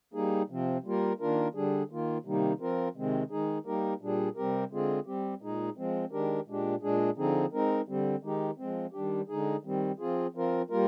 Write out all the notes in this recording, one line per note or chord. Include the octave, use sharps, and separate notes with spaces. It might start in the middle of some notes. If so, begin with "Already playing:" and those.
G3 A#3 D#4 G#4
C3 F3 C4
G3 A#3 F4 A#4
D#3 A#3 D4 F4 A#4
D3 G3 D4 G#4
D#3 A#3 F4
C3 D#3 G3 A#3 D#4
F3 C4 F4 A#4
C3 D#3 G#3 C4
D#3 G#3 D#4 G#4
G3 A#3 D#4 G4 A#4
A#2 G3 D4 G#4
C3 G3 C4 G4 A#4
D3 G#3 C4 F4 G#4
G3 C4 G4
A#2 G#3 D#4 G#4
F3 G#3 C4
D#3 G#3 D4 G4 A#4
A#2 G#3 D4 G4
A#2 G#3 D4 G#4
D3 F3 C4 D#4 G#4
G#3 C4 D#4 A#4
D3 G3 C4
D#3 G#3 D#4 G4
F3 G#3 C4
D#3 G3 D4 G4
D3 G#3 D#4 G#4
D#3 G3 C4
F3 C4 F4 G#4
F3 C4 F4 A#4
G3 A#3 F4 A#4